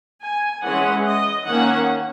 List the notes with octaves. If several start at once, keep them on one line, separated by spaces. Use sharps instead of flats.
G#5
E3 G#3 C#4 F#5
D#5
D#3 A#3 C#4 F#5